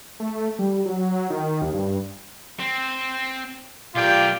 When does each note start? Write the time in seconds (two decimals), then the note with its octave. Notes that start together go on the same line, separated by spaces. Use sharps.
0.20 A3
0.59 G3
0.85 F#3
1.30 D#3
1.62 D#2
1.74 G2
2.59 C4
3.95 B1 F4 G4 A#4 D5 G5